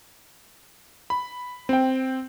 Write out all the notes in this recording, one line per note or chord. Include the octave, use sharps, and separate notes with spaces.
B5
C4 G5